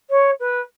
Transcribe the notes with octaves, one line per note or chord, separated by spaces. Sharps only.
C#5
B4